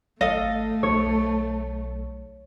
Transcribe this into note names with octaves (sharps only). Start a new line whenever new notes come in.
G#1 A3 A4 D#5 F5
B1 C#5